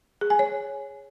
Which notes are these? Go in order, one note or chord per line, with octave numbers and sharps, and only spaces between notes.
G#4
G#5
C#5